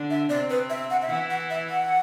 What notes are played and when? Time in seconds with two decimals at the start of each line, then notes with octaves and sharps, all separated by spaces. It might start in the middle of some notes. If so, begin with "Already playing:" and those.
Already playing: D3 D4
0.10 E5
0.30 C3 C4 D5
0.50 B4
0.70 E5
0.90 F#5
1.02 E5
1.09 E3 E4 F#5
1.30 F#5
1.50 E5
1.70 F#5